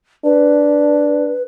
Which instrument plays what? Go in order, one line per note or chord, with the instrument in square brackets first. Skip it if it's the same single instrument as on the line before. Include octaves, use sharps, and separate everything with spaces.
[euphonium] D4 [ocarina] B4